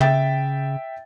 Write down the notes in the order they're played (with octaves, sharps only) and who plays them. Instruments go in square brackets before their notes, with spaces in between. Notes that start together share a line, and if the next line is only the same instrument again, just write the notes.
[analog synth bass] C#3 [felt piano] E5 G5 A6